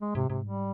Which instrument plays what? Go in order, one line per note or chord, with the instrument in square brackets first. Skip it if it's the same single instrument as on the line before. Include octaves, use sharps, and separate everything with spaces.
[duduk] G#3
[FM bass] G#2 [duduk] C3
[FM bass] G#2 [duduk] C3
[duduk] G3